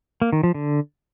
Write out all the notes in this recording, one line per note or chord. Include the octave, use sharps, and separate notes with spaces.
A#3
D#3
F3
D3